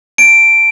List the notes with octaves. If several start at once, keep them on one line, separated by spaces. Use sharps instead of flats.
A5 D7